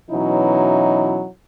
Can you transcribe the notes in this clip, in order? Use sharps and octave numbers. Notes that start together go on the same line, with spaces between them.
B2 E3 F#3 C#4 D#4 E4